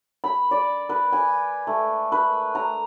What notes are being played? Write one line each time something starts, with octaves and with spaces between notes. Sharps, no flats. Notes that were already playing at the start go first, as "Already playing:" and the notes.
B5
D5
B4
G#5
A3
B4
A#5